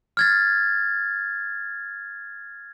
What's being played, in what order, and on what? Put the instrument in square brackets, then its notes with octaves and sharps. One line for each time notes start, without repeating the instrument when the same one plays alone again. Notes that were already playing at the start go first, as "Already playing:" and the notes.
[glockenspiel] F6 G#6 A6